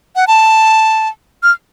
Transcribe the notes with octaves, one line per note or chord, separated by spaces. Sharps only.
F#5
A5
F6